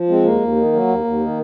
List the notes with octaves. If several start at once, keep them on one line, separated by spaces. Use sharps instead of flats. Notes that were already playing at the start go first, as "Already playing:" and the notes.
Already playing: F3
G#3 C4
D#2 A#3
D#2
D#3
F#3
D#2
D#2
D#3